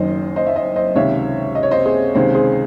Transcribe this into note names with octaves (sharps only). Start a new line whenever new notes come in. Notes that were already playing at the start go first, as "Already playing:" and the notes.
Already playing: F#1 F#2 D#3 C5 D#5
C5 D#5
E5
C5 D#5
C5 D#5
C#2 C3 D#3 C#5 E5
D#5
C#5
C5 D#5
G#4 C5
C#2 C3 D#3 G#4 C5
G#4 C5